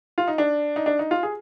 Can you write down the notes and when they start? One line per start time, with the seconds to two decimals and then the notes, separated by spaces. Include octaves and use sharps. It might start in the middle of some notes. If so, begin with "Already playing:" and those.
0.18 F4
0.28 D#4
0.38 D4
0.76 D#4
0.86 D4
0.99 D#4
1.11 F4
1.23 G#4